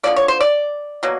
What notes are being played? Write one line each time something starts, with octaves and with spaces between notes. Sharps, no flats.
D3 F3 A#3 D5
C#5
C5
D5
B2 F#3 A#3